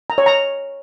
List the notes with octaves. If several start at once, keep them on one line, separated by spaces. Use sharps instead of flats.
A#5
C#5
A#5